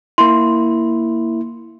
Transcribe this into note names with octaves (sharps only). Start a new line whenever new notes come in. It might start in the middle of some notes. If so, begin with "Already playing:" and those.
A#3 E4 C6